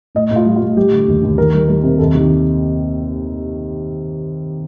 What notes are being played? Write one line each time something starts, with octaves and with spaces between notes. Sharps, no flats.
A2 D#5
A2
F4
G3
F4
A2
G3 G4
D3
D#2
D#2
D#3 A#4
G3
G3 A#4
C3
D#2 A4
D#3 G4